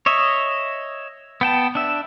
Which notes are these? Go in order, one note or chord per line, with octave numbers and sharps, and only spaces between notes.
C#5 D#5 E5
B3 G5 A5
D4 E5